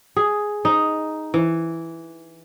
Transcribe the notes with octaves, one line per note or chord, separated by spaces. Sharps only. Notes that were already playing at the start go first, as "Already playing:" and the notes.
G#4
D#4
E3